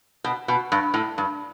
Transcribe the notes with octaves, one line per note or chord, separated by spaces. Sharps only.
B2
B2
G2
A2
G2